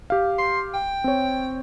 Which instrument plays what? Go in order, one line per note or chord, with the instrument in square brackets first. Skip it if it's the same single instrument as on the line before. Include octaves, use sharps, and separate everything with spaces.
[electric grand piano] G4 F5
[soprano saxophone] C6
G5
[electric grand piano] C4 C#5